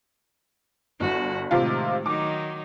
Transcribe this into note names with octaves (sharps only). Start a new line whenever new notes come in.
G1 E4 F#4
A2 C3 D#3 G#3 F4
D#3 F#3 D#4 D6